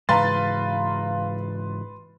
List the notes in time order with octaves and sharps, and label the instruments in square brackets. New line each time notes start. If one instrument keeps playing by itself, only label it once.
[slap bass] G#2 C#3 E3 [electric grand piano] B4 C6 A6 [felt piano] F5 A#5